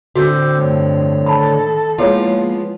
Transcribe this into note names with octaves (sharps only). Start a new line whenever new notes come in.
A2 D3 C4 F#4 D6 E6 G6
G2 F3 A3 C#5
D#3 A4 A5 B5
F3 G#3 A#3 B3 E4 F4 G#4 C#5